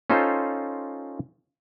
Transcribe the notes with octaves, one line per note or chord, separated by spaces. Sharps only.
C#4 D#4 F4 A4 C5